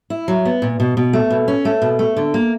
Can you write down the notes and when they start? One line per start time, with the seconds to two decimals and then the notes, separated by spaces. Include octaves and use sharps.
0.10 E4
0.28 F#3
0.45 B3
0.62 A#2
0.80 B2
0.97 B2
1.13 A3
1.30 B2
1.48 C#4
1.65 A3
1.82 B2
1.99 A3
2.17 D3
2.34 A#3